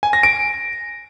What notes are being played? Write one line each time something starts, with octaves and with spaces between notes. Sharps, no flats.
G#5
A#6
D7